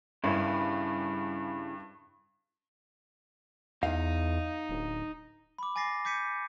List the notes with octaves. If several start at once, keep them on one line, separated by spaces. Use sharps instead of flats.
G2 C#3 E4
E2 D#4 F5
D1
B5 D6
G#5 D6 A6 A#6 C7
D6 G6 B6 C#7 D#7